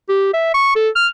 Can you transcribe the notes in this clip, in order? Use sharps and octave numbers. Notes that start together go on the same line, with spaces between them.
G4
E5
C#6
A4
F6